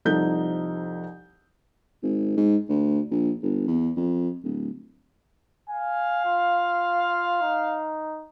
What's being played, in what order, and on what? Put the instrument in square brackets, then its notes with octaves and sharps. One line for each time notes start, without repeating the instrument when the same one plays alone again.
[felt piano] C2 F3 D#4 A4 G6
[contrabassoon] G#1
G#2
D2
A#1
G1
E2
F2
D1
[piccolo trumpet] F5 [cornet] G#5
[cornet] F4
D#4